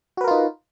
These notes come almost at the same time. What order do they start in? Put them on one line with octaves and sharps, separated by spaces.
F#4 B4 A#4 F4 D#4